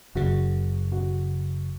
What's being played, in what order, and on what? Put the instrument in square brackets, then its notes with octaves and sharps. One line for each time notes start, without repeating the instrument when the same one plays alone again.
[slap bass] F#1 F#2 C#3 [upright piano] F#4
[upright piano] F#4